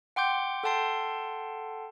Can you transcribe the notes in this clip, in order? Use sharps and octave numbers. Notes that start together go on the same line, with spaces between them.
F#5 G5 C6 D6 G6
A4 F#5 G5 A5 C6 C7